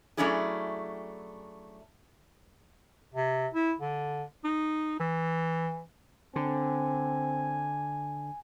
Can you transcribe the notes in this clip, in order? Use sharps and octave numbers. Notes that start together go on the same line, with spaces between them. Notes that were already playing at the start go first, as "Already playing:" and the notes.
F#3 A3 C#4 D4 E4 G#4
C3
E4
D3
D#4
E3
D3 C4 G#5